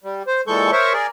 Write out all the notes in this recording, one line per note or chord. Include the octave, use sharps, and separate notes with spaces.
G3
C5
A#2 E3 G#3 A4 C#6 G6
A#4 C5 C#5 E5 C#6
G#4 A#4 D5